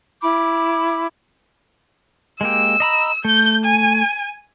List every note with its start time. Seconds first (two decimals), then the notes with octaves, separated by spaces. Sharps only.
0.22 E4 B5 D6
2.41 G#3 A#3 G4 E6
2.80 D#5 A#5 B5
3.25 A3 G6
3.65 G#5